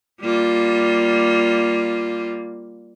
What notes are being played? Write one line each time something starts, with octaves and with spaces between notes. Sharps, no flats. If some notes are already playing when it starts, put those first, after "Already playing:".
G3 A#3 F4